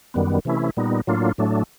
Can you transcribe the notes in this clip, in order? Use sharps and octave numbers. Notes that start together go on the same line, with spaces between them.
F#2 D#3 G3 B3
C3 E3 A3 C#4 E4
A#2 G3 B3 D#4
A2 F#3 A#3 D4 F4
A2 F#3 A3 D4